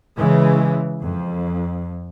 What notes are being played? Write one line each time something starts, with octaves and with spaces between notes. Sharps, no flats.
C#3 E3 G#3
F2